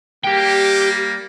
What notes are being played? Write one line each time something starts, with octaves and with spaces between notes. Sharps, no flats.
G3 A#3 G4 G5